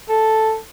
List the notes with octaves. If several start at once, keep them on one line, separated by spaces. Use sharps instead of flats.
A4